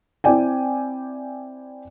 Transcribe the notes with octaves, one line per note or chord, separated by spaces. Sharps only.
C4 E4 D5 G5 G#5